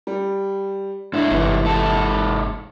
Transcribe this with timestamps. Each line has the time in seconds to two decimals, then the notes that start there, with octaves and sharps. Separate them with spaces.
0.07 G3
1.13 G#2 D4 E4
1.31 G1 C3 E3
1.64 G#2 A4 A5